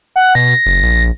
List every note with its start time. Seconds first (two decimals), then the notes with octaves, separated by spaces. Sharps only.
0.16 F#5
0.35 B2 A#6
0.66 F#1
0.83 A#1